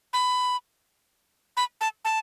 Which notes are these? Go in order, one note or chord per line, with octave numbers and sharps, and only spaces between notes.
B5
B5
A5
A5